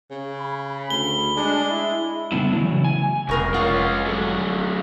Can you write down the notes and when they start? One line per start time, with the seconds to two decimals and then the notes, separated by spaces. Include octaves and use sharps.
0.11 C#3
0.40 B5
0.90 D2 G7
1.37 G#3 D4
1.70 E4
2.32 C#3 G3 A3 B3 D4 E4
2.52 C#3 E3 F#3 A3
2.84 G#5
3.29 F1 C2 G#4 A#4 C#6
3.54 G#3 C#4 F4 F#5 C#6
4.06 F#3 A3